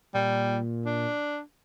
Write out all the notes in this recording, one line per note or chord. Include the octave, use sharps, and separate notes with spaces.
A#2 G3
D4